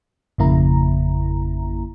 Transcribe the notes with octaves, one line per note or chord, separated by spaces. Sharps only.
G#1 F2 C#3 A#3 E4 A#5